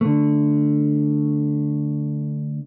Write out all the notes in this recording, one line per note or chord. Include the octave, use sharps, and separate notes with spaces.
D3 A3